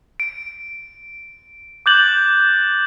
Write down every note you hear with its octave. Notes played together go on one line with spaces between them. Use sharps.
D7
D6 F#6 G6 A6 F#7